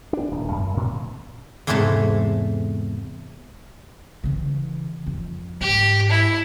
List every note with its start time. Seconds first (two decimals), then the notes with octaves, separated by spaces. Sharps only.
0.13 D4
0.31 D#1
0.51 F#2
0.77 A2
1.67 E2 G#2 C3 G#3 A3 A5
4.24 C#3 E3
5.06 F2
5.61 G#2 G4
6.10 E4